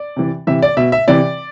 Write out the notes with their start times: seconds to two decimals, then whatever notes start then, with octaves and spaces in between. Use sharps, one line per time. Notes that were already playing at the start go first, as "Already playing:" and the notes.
Already playing: D5
0.16 C3 E3
0.47 C3 E3 E5
0.62 D5
0.77 B2 E5
0.92 E5
1.08 C3 E3 D5